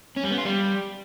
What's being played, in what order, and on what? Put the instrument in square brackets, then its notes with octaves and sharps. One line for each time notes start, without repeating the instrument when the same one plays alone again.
[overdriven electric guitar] C#4
G3
B3
F4
G3